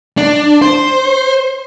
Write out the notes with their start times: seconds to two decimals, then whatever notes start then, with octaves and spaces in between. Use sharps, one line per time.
0.17 D4
0.62 C5